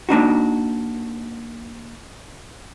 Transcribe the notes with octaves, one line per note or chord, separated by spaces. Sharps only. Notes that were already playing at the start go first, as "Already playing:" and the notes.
A#3 D4 D#4 F#4